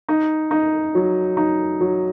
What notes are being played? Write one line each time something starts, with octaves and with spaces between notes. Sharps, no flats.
D#4
D#4
F#3
D#4
F#3